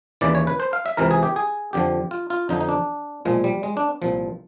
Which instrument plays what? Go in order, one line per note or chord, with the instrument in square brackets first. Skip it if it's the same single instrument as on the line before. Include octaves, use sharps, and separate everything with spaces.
[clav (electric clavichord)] D#2 C#3 E3 D5
C#5
B4
C5
F5
E5
C#2 C3 E3 A#4
G#4
G4
G#4
F2 D3 F3 G4
F4
F4
F2 D3 F3 D#4
D#4
D4
B1 A#2 F3 G#3
G3
G#3
D4
C2 A#2 F3